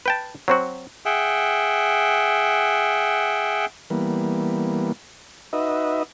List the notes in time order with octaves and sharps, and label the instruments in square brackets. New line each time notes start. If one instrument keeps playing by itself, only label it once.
[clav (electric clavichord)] B4 G5 A5
F#3 C4 F#4
[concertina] G#4 E5 F#5 G5
[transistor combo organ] E3 G3 A#3 B3
D#4 F#4 B4 D#5 E5